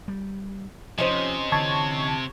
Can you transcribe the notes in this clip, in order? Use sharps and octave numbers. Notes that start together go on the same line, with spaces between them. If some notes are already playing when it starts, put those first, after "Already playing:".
G3
C3 F3 C#4 D#4 C5
D3 E3 A5 C#6 G#6